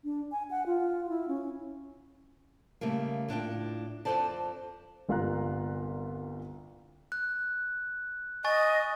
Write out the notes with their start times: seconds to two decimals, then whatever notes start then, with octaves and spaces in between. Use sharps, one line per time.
0.04 D4
0.32 G#5
0.51 F#5
0.66 F4
1.09 E4
1.28 C#4
2.81 C#3 G3 A3 A#3
3.28 A2 D4 F4 G5
4.05 F2 G#2 A4 C5 D5 A5
5.09 G1 C2 F4 F5 A#5 F#6
7.12 F#6
8.44 D#5 G#5 C#6 A6